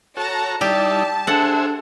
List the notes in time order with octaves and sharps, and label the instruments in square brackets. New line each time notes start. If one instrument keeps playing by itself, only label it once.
[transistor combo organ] F#4 A4 C#5 [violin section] A5 A#5
[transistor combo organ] G3 D#4 E4 [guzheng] G4 [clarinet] D5 [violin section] A5
[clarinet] D4 [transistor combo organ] G#4 C5 E5 [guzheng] A4 F#5